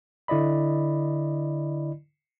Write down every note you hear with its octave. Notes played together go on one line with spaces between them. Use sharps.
D3 E4 D5 D#5 B5